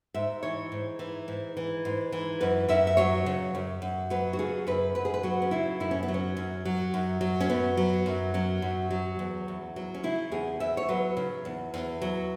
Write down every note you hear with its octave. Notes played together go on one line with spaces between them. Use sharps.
G#2 E5
E3 C#5
G#2
E3
G#2
E3
G#2
E3
F#2 B4
F#2 E5
E5
F#3 C#5
C#3
F#2
F#2
F#3 B4
F#4
C#3 G#4
F#2 B4
F#2 B4
G#4
B4
F#3 F#4
C#4
C#3 E4
F#2 E4
C#4
B3
F#3
C#4
F#2
F#3
F#2
F#3
C#4
F#2 B3
F#3
F#2
F#3 C#4
F#2
F#3
E2
E2
F#3
C#4
C#3 E4
E2 G#4
E2 E5
C#5
F#3 B4
C#3
E2
E2
F#3